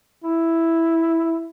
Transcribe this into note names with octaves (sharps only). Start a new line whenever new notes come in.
E4